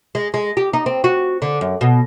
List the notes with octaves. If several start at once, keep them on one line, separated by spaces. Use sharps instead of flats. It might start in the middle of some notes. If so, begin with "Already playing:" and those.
G#3
G#3
G4
D#4
C4
F#4
D3
F#2
B2